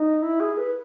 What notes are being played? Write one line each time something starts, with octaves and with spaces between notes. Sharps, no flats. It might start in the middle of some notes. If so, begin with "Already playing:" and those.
Already playing: D#4
E4
G#4
B4